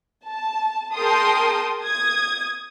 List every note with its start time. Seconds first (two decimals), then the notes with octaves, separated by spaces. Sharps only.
0.27 A5
0.95 G#4 A#4 G5 A5 C6 D#6
1.83 D#6 G#6